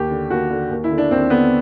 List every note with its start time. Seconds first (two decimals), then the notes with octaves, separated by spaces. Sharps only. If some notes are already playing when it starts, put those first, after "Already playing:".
Already playing: D#2 G4
0.10 D3
0.30 D#2 F#4
0.50 D3
0.70 D#2
0.84 E4
0.91 D3
0.98 D4
1.11 D#2 C4
1.30 D3 B3